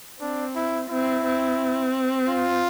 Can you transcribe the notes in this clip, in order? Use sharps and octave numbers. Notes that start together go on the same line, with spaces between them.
C4 D4
E4
C4 E4
C4
F4